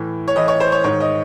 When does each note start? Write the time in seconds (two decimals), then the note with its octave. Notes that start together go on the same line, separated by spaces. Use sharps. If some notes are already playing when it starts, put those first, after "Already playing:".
Already playing: A2 E3
0.28 C#5
0.36 A2 E3 D#5
0.48 C#5
0.60 C5
0.72 C#5
0.84 G#2 D#3 C#5
1.00 D#5